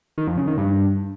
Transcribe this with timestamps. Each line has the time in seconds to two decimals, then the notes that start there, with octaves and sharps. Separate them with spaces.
0.18 D#3
0.28 F2
0.38 C#3
0.47 D#3
0.57 G2